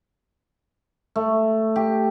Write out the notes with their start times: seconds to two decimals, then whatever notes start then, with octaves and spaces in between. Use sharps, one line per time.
1.16 A3
1.76 G4